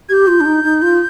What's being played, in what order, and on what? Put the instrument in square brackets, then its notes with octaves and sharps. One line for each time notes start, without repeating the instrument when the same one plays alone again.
[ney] G4 [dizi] G6 G#6
[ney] F4
D4
D#4
D#4
F4